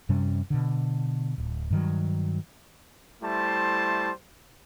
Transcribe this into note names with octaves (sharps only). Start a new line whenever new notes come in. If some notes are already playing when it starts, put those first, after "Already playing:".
F#2 C3 G3 C#4
B2 D3
D1
G2 D#3 F#3
G3 A3 E4 C5 A5 C6